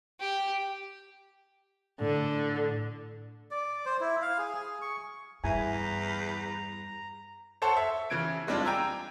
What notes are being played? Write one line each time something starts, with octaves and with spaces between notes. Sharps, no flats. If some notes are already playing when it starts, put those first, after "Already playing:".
G4
A2 D3
D5
C5
E4
F5
G#4
G#4
C#6
E2 G2 E4 G#5 A#5
A4 C5 C#5 F#5 A5
E5
C#3 E3 G#6 D7
G3 G#3 C4 D4 F4
G5 G#5 A#5 E6